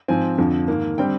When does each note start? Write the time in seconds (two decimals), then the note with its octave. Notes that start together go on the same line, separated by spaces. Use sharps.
0.08 G#2 F3 C4 G#5
0.38 F2 D3 F3
0.68 G#2 D#3 A#3
0.98 D3 G3 C4 G5